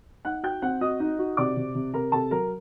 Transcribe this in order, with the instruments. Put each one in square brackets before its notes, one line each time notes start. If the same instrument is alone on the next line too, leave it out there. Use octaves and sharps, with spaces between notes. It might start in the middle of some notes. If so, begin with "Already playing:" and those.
[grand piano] D#4 [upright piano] F#5 F#6
[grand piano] F#4 [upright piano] G5 G6
[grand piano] C4 [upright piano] F#5 F#6
[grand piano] F#4 [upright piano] D#5 D#6
[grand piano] D#4
F#4
[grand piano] C3 [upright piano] D5 D6
[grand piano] C3
C3
[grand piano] C3 [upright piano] A#4 A#5
[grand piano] C3 [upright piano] A4 A5
[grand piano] F#3 [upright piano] A#4 A#5